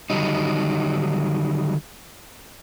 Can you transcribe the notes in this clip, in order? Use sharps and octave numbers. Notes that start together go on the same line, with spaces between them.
D3 D#3 F#3 G3 D#4